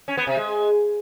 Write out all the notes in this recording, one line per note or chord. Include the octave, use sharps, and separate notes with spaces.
C#4
B3
C3
G#3